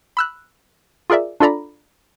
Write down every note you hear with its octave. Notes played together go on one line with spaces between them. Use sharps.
B5 E6 F#6
F4 G#4 A#4 D5 E5
D4 F4 A4 D5 A#5 B5